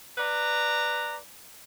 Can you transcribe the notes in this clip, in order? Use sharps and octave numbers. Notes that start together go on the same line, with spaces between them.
B4 D5 A#5